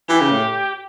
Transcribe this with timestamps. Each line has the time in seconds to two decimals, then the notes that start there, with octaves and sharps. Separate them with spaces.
0.09 E3 G4
0.21 C#3
0.31 A2